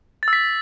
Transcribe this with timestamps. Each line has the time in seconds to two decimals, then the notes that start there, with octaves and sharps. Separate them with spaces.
0.23 A6
0.28 E6
0.33 B6